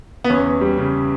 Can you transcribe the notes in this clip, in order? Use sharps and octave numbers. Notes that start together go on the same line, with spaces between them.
B3
E2 C#4
E2
G3
C#3